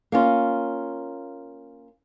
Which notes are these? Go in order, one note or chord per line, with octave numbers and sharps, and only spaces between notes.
A#3 C#4 F4